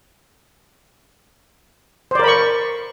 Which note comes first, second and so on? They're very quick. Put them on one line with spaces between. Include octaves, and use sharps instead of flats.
C5 D5 A#4 B5 C#6